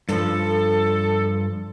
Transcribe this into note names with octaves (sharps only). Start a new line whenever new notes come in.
G2 F3 A4